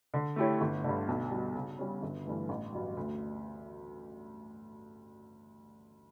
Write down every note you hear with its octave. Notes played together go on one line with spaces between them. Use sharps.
D3
A3 E4 G4 C#5
G1
G2 D3
B1
B2 G3
C#3
G3 C#4
G1
G2 E3 A3
A1
G2 F#3
D2